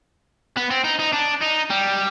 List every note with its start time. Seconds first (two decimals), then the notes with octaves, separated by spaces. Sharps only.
0.57 B3
0.71 C4
0.85 D#4
1.00 D#4
1.13 D4
1.42 D#4
1.70 G3